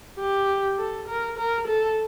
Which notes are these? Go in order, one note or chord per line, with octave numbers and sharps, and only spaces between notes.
G4
A4
A#4
A#4
A4